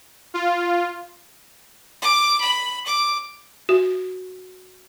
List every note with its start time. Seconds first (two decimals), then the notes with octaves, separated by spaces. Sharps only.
0.34 F4
2.02 D6
2.40 B5
2.86 D6
3.69 F#4